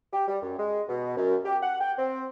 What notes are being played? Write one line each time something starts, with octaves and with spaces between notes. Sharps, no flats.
G4
G3
F#2
G#3
B2
F#2
G4
F#5
G5
C4